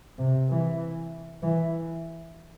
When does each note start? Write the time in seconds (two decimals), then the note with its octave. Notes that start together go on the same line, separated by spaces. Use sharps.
0.18 C3
0.49 E3
1.43 E3